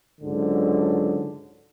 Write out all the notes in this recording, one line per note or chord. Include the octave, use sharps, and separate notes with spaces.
C#2 G#2 D3 F#3